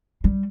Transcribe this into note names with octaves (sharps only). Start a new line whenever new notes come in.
G3